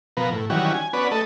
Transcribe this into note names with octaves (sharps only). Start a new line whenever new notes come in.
B2 F3 B3 A#4
A2
D#3 E3 F#3 G3 C#4 F#4
G#5
B3 C#4 F#4 B4 D5
A3 A4 D#5